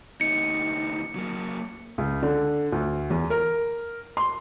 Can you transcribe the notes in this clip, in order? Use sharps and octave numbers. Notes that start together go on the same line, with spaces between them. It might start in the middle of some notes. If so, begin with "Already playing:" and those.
D2 D#4 C#7
F#3 A#3
C#2
D3
D2
E2
A#4
C6